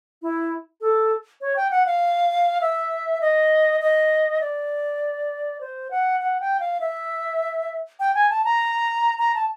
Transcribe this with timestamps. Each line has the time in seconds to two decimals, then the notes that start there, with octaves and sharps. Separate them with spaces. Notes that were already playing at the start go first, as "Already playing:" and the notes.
0.22 E4
0.81 A4
1.41 C#5
1.56 G5
1.71 F#5
1.86 F5
2.61 E5
3.21 D#5
3.81 D#5
4.41 D5
5.61 C5
5.91 F#5
6.20 F#5
6.40 G5
6.60 F5
6.81 E5
8.00 G5
8.15 G#5
8.30 A5
8.45 A#5
9.19 A#5
9.35 A5